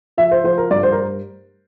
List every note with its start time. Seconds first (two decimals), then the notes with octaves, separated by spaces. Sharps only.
0.17 F3 E5
0.31 C5
0.44 F3 C5
0.58 A#4
0.71 G2 D5
0.83 C5
0.92 A#4
0.96 C5